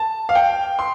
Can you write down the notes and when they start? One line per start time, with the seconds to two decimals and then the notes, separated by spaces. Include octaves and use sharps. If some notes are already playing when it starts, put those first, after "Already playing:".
Already playing: A5
0.29 F5
0.35 G5
0.79 C6